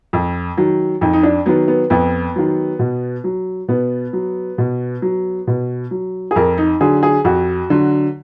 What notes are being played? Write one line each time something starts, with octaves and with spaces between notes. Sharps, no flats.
F2
D#3 F#3
F2 D#4
D#4
D4
D#3 F#3 B3
B3
F2 B3
D#3 F#3
B2
F#3
B2 B3
F#3
B2
F#3
B2
F#3
G#4
F2 A#4
D#4
D3 F#3 G#4
G#4
F2 F#4
D3 F#3